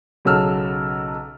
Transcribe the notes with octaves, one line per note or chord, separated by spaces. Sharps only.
B1 C#3 F#3 A4 E6 F6